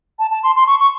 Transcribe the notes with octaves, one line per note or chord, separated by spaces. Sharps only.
A5
A5
C6
C6
C#6
C#6